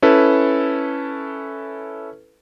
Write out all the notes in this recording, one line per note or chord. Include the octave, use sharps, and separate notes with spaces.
C#4 E4 A4 B4